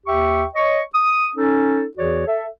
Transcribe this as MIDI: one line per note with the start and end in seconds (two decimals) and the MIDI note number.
0.06 0.45 39
0.06 0.45 67
0.06 0.45 76
0.06 0.45 79
0.06 0.45 85
0.55 0.80 73
0.55 0.80 75
0.55 0.80 85
0.94 1.29 87
1.36 1.85 61
1.36 1.85 63
1.36 1.85 69
1.98 2.25 40
1.98 2.25 52
1.98 2.25 66
1.98 2.25 68
1.98 2.25 73
1.98 2.25 74
2.27 2.46 69
2.27 2.46 76